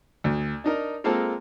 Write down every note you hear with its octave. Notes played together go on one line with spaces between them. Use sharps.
D2
D4 D#4 A#4
G#3 A#3 C4 F4 A4